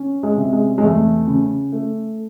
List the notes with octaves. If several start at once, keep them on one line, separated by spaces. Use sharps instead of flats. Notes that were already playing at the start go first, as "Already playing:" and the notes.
Already playing: C#4
G#3
C3
G#3
G#3
E2 A3
C#3
A3